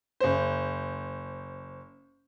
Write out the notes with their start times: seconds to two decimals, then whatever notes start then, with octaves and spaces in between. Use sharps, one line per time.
0.20 F#1 C5